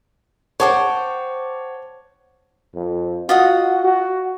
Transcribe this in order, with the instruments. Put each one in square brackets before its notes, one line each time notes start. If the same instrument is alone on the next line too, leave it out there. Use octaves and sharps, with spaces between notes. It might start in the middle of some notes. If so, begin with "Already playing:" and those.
[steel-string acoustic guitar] C5 F#5 G5 [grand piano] C#5 A5 D6
[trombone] F2
[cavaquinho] F4 D#5 F#5 [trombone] F#4
[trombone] F#4